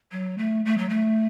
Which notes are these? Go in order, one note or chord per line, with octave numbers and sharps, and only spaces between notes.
F#3
A3
A3
F#3
A3